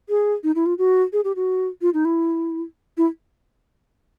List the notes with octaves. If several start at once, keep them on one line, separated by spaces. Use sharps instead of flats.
G#4
D#4
E4
F4
F#4
G#4
G4
F#4
F4
D#4
E4
E4